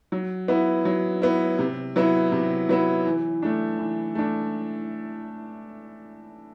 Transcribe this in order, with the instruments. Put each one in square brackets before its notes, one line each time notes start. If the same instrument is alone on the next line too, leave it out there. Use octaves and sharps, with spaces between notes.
[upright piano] F#3
B3 E4
F#3
B3 E4
C3
F#3 B3 E4
C3
F#3 B3 E4
E3
A3 D4
E3
A3 D4